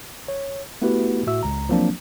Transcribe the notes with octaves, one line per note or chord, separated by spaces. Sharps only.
C#5
A3 B3 E4 F#4 G4 B4
A2 F#4 E5 E6
C#2 A#5
F3 F#3 A#3 C4 D4